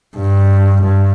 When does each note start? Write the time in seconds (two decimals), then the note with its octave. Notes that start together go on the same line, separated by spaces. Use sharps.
0.17 G2
0.82 G2